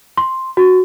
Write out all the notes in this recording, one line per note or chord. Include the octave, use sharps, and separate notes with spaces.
C6
F#4